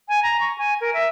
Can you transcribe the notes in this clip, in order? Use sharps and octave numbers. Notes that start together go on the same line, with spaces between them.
G#5
A#5
C#6
G#5
A#4
E5